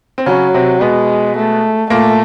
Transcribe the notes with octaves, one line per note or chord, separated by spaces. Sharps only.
C4
C#3 F#3 C#4
C3 C4
B2 G#3 B3
A3
A#2 A3 A#3